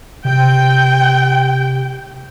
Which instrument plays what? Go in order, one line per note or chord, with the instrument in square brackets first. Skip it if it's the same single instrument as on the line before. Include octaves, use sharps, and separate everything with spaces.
[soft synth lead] C3 [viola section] G5